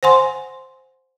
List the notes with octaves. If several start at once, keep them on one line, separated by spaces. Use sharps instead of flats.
C5 F#5 G#5 C6